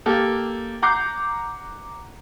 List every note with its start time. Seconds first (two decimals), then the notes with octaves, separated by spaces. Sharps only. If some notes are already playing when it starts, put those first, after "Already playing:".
0.06 A#3 G4 A4
0.82 F#5 A#5 D6 G6 C7